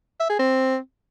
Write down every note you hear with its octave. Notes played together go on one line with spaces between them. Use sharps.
E5
G#4
C4